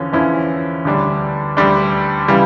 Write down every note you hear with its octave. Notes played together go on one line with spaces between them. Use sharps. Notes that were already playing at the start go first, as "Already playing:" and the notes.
Already playing: E2 D3 F3 C#4
E2 D3 F3 C#4 E4
D2 D3 G3 D4
D2 D3 G3 D4
C#3 E3 G3